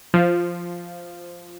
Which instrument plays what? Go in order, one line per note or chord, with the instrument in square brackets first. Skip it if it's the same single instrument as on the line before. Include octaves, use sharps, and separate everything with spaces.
[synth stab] F3